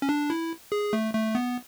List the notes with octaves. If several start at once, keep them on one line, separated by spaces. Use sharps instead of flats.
C#4
D4
E4
G#4
A3
A3
B3